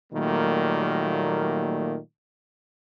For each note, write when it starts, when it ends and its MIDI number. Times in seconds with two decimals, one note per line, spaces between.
0.13 1.98 46
0.13 1.98 51
0.13 1.98 54
0.13 1.98 55
0.13 1.98 57
0.13 1.98 58